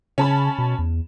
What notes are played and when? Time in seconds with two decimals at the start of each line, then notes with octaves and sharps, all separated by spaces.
0.18 C#3 C#4 A5 B5
0.58 B2
0.79 E2